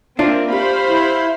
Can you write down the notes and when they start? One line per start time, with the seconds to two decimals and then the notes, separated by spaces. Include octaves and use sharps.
0.19 A#3 C4 D4 F4 A#4 E5
0.53 G4 C5 F5 B5
0.89 E4